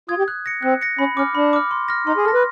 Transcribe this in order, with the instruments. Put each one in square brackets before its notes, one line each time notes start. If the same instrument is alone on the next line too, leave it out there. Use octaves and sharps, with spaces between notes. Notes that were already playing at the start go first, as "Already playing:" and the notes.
[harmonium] F4 [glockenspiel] D#6 G#6
[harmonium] G4
[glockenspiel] F#6
A#6 C#7
[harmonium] C4 [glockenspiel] F#6
[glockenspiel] A#6 C#7
[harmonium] C#4 [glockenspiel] B5
[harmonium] C#4 [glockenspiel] D6 F6
[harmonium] D4 [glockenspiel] B5
[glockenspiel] D6 F6
C6
F6 A#6
[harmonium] D#4 [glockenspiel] C6
[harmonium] G#4
[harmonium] A4 [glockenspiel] F6
[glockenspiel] A#6
[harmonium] B4